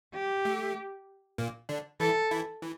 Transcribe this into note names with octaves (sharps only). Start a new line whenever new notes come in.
G4
A3
A#2 A#3
D3 D4
E3 E4 A4
E3 E4
E3